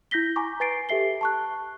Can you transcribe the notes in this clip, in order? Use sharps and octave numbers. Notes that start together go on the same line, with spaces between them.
E4 G6 A#6 B6 G7
G#5 A#5 C#6 D6
B4 G#5 A6 C7 D7
G4 A4 E5 C7 G7
A5 C#6 F#6